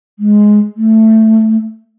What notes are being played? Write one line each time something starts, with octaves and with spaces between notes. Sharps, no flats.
G#3
A3